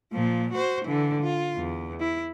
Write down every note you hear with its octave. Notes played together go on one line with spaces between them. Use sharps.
A#2 F3
F#4 C5
D3 E3
F4
E2
E4